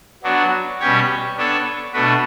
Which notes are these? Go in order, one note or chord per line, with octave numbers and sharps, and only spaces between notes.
F#3 B3 D4 F#4
B2 G3 C#4 G4 C#5
B3 D4 A4 C#5
B2 A3 D4 F#4 B4